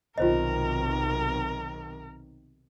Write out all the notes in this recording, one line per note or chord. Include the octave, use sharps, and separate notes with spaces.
B1 C3 D#3 F4 A#4 C5 D#5